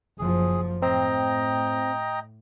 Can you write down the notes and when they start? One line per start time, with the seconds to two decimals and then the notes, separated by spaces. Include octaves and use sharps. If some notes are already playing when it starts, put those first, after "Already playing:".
0.19 F#1 F3 G#4
0.82 A2 C4 D#5 G5 A#5